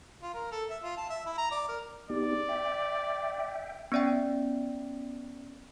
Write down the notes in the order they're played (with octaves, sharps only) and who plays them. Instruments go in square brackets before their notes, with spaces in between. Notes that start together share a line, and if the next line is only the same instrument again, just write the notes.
[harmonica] F4
A#4
A4
E5
F4
A5
E5
E4
A#5
D5
A#4
[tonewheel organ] B3 D#4 G4 [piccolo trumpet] D5
[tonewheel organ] E5 G5
[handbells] B3 C#4 D5 E5 G5